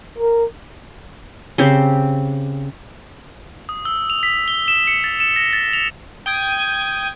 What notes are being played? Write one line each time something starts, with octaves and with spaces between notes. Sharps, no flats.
A#4
C#3 C4 G4 C5
D#6
E6
F7
B6
G7
E7
C#7
A6
E7
A#6
A6
F7
G5 D#6 G#6